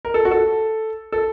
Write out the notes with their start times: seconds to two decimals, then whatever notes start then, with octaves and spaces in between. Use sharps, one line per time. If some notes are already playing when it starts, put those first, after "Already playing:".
0.05 A#4
0.14 A4
0.25 F#4
0.31 A4
1.12 A4